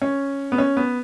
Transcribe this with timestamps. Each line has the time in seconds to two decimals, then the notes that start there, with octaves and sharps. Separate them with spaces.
0.02 C#4
0.52 B3
0.58 C#4
0.77 B3